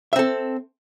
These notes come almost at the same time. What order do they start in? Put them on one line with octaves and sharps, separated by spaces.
E5 C4 A4